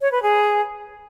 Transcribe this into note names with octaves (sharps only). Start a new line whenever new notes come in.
C#5
B4
G#4